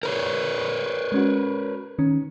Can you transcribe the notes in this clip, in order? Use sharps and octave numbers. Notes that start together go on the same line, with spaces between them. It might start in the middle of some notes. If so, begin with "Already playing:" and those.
A#4 B4 C#5
G#3 C#4 F#4
D#3 C#4